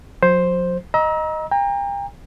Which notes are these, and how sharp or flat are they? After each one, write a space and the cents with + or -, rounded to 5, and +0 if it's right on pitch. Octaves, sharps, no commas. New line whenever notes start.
F#3 -40 C5 +5
D#5 +0 A#5 +30 E6 -30
G5 +40 A#5 +0